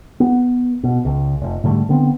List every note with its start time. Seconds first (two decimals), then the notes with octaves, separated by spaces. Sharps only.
0.20 B3
0.83 B2
1.05 C#2
1.41 F1
1.63 G#2 D3 G3 A3
1.89 D3 B3 C4